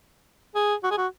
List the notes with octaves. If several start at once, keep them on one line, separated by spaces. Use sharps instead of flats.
G#4
F#4
G#4
F#4